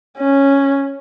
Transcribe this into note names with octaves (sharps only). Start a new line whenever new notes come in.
C#4